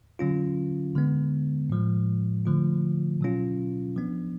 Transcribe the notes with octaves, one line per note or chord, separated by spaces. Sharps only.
D3 F#3 C#4 F4
D3 G#3 B3
A2 F3 G#3
D3 F3 A3 F4
B2 F#3 C#4 F4
F3 B3 D4